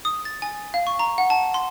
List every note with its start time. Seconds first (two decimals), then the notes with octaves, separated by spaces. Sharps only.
0.05 D#6
0.25 A6
0.42 G#5
0.74 F5
0.87 C#6
0.99 A#5
1.18 F#5
1.30 A5
1.54 C6